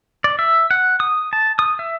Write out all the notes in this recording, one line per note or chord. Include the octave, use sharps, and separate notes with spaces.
D5
E5
F#5
D#6
A5
D#6
E5